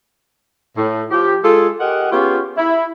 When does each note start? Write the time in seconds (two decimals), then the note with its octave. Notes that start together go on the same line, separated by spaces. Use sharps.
0.76 A2
1.11 F3 G4
1.44 G#3 F4 G#4 A4
1.80 G4 G#4 A#4 D#5 F#5
2.11 B3 C#4 F4 G4 G#4 C#5
2.57 E4